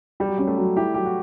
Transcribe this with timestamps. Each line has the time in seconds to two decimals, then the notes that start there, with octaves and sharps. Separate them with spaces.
0.20 G3 G4
0.28 F#3
0.38 G3 C#4
0.47 A3
0.57 F#3
0.77 E4 G4
0.94 F#3 G4
1.06 F#4